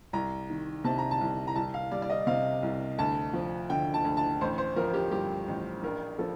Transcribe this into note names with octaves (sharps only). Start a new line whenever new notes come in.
C2 A#5
D#3
C3 A5
A#5
A5
C2
A#5
C2 A5
F5
G3 D5
D5
D#5
C3 F5
C2
D2 A5
F3
D3 G5
A5
D2
A5
A1 C5
C5
F3 A#4
G4
G2 G4
A1
A#1 A#4
F3 A4